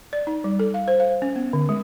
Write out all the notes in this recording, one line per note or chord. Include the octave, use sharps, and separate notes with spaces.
D5
D#4
G3
A4
F5
C5
F5
C#4
B3
D3
G#3